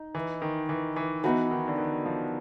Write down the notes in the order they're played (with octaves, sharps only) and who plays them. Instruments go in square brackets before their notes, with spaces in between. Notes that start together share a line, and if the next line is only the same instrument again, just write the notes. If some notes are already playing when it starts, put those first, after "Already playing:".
Already playing: [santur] D#4
[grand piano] E3
D#3
E3
E3
[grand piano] E3 [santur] B3 D#4 F#4 B4
[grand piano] D#3
D3
D#3
F3